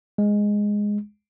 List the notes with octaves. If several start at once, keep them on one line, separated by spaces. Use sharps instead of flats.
G#3